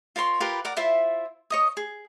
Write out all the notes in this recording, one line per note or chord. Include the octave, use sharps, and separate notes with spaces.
F4 A#4 C#5 C6
F4 G4 A#4 B4
A#4 D5 F#5
E4 F4 C5 E5
C#5 D#5 D#6
G#4